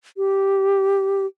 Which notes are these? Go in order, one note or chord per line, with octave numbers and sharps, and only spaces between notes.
G4